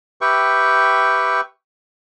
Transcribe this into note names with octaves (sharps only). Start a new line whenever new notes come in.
G4 B4 E5 G5 C#6